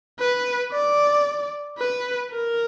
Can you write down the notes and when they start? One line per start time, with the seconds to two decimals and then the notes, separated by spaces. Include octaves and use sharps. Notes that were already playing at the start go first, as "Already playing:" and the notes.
0.19 B4
0.72 D5
1.78 B4
2.31 A#4